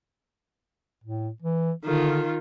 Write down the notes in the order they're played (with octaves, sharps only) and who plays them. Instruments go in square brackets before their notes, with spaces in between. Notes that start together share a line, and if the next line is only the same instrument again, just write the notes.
[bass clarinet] A2
E3
[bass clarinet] D3 [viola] D#3 F4